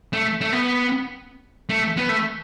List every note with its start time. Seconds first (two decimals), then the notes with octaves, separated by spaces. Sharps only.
0.13 A3
0.41 A3
0.53 B3
1.69 A3
1.97 B3
2.09 A3